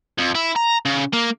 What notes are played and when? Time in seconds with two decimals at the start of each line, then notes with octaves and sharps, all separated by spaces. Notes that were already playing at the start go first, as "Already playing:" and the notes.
0.18 F2
0.35 E4
0.56 A#5
0.85 C#3
1.13 A#3